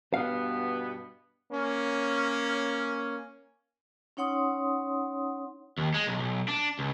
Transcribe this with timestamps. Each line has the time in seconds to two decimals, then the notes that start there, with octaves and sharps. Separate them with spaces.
0.14 G2 B2 B3 F5
1.51 A#3 C#4
4.17 C#4 D#4 C#5 F#5 C6 D#6
5.78 D#2
5.94 G#3
6.07 B1
6.19 B1
6.48 D4
6.79 C#2